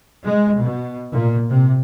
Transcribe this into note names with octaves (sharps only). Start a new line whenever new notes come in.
G#3
B2
A#2
C3